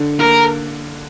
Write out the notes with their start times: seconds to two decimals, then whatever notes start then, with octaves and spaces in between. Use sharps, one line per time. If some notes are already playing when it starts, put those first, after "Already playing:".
Already playing: D3
0.19 A#3 A#4